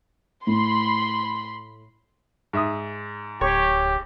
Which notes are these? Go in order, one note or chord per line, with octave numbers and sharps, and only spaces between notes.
A2 B5 C6
G#2 E5 D#6
D1 G4 C#5